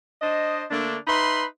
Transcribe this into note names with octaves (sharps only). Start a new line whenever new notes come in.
D4 C5 D#5
D3 A3 A#3 D4
D#4 B4 E5 B5 C6